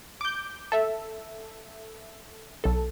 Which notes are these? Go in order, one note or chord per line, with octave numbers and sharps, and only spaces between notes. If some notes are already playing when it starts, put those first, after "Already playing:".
D6 G6
A4 E5
B1 A4